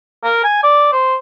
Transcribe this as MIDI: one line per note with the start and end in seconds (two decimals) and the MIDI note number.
0.24 0.39 70
0.44 0.59 80
0.63 0.89 74
0.93 1.15 72